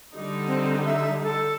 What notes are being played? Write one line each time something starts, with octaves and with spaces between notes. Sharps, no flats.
D3 G3 D#4
C4
E5
A4